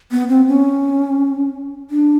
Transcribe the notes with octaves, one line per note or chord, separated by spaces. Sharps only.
B3
C4
C#4
D4